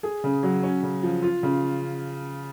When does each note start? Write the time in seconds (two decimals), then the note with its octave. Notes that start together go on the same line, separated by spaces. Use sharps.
0.03 G#4
0.24 C#3
0.43 F#3
0.63 C#4
0.83 C#3
1.03 F3
1.23 F4
1.43 C#3